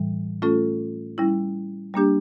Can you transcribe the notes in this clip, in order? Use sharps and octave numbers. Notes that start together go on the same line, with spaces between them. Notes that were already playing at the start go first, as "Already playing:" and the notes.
Already playing: A2 E3 G3
A3 C#4 F4 A4
G3 C#4 E4
G3 A#3 D4 G4